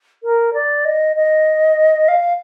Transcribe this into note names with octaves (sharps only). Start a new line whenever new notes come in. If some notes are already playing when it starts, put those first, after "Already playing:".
A#4
D5
D#5
D#5
F5